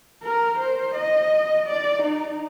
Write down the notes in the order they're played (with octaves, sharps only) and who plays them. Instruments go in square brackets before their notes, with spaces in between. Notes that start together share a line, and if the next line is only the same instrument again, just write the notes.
[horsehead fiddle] A#4
C5
D#5
D5
D#4